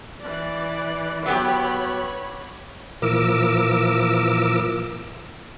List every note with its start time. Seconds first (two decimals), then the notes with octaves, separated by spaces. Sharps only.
0.20 E3 D5
1.26 F#3 B3 G4 C#5 B5
3.02 A#2 E3 F3 A#4 D6 E6